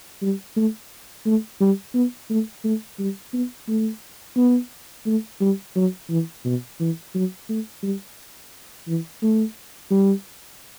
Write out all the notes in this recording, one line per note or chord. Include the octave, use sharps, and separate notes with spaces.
G3
A3
A3
G3
B3
A3
A3
G3
B3
A3
B3
A3
G3
F#3
E3
B2
E3
F#3
A3
G3
E3
A3
G3